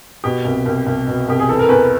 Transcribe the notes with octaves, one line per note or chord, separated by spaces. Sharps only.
B2 G4
C2
C2
C2
B2
C2 G4
G#4
E3 A4
A#4
E2 B4